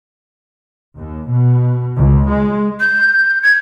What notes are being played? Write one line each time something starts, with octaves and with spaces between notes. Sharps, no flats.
D#2
B2
C#2
G#3
G6
G#6